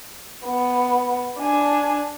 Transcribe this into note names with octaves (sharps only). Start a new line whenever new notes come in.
B3
D4 G#5